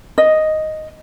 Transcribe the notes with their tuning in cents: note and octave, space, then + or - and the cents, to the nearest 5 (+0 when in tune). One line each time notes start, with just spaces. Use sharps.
D#5 +0